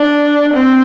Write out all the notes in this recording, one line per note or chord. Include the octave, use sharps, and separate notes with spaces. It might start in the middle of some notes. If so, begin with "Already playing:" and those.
Already playing: D4
C4